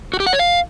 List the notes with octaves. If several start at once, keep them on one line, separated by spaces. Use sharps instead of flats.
F#4
G4
F#5
C#5
F5